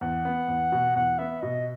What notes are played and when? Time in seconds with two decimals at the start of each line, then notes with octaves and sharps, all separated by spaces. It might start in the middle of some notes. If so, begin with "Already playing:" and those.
0.01 E2 F#5
0.25 B3
0.48 E2
0.72 B2
0.95 E2 F#5
1.19 B3 E5
1.42 B2 D#5